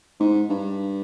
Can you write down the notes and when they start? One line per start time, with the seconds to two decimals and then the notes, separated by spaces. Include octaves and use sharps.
0.20 G#2
0.50 G2